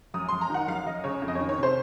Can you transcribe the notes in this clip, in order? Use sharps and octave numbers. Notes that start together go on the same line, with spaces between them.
F#2 D#6
F#2 C6
A#5
D#3 F#5
F#2 F5
F#2 D#5
C#3 C#5
F2
D#5
C#5
D#3
C#5
C3 C5